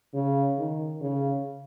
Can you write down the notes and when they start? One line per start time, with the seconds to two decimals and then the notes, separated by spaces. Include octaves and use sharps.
0.14 C#3
0.58 D#3
1.01 C#3